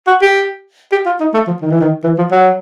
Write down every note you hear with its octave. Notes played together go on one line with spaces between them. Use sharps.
F#4
G4
G4
F4
D#4
A3
F3
D#3
E3
D#3
E3
F3
F#3